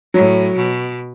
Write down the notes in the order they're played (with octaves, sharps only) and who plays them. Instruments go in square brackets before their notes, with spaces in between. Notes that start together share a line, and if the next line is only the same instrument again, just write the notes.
[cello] A2 [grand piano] F#3
[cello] B2